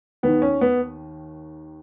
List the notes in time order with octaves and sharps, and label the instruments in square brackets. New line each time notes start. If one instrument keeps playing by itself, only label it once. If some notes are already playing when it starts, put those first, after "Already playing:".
[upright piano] D#2 B3
D#3
C#4
B3